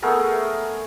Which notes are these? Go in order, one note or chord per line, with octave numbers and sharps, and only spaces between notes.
A3 B3 G#4 A#4